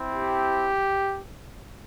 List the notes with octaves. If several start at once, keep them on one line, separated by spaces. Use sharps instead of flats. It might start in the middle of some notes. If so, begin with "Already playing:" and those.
Already playing: C4 E4
G4